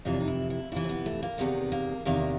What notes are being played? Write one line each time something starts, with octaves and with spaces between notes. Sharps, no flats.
F2 C3 E3 D#4
D4
D#4
E4
E4
F2 C3 E3 E4
C4
B3
A3
A#3
E2 C3 D#3 B3
A#3
E2 C3 D#3 A#3